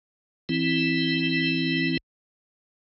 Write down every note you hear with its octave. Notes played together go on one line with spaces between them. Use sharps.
E3 C4 E4